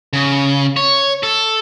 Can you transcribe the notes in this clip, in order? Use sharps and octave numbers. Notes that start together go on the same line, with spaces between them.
C#3
C#5
A4